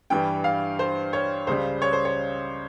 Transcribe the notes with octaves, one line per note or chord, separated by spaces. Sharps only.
G2 E3 G3 G5
F5
C5
C#5
C#2 C#3 G3 C5
C#5
C5
C#5